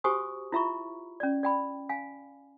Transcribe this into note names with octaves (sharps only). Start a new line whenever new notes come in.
F#4 G4 C5 G#5 C#6 D#6
E4 F4 E5 A#5 B5 C#6
C#4 D5
D5 G5 B5
F5 G#5